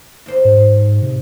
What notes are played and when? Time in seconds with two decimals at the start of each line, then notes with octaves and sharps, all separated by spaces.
0.26 D#2 C5
0.45 G#2
1.02 C3